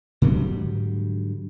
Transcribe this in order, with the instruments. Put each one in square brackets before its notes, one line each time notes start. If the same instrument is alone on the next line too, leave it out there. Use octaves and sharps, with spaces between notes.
[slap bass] G#2 D3 F#3 G3